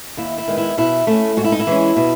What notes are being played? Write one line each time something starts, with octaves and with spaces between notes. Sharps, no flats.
D#2 E4
E4
D#3 G#3 B3
E4
B2 E4
A3 C#4 E4
G#2 F#4
E4
D#4
E4
E3 G#3 C#4
B2